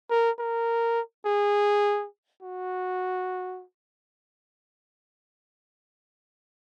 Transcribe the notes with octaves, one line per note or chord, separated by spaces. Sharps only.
A#4
A#4
G#4
F#4